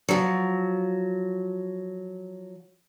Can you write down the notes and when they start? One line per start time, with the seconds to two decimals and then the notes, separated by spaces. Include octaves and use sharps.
0.09 F3 F#3